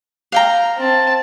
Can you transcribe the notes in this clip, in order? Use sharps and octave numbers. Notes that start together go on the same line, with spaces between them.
F5 G5 A#5
C4 A5